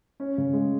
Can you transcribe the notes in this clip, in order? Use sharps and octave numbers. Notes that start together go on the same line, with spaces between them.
C#4
C#3
G#3